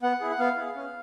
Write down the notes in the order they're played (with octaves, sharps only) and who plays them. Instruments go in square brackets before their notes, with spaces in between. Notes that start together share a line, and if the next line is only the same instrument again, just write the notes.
[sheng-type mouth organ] B3 F#5
E4 G#4
F#5
B3 F5
E4 G#4
C#4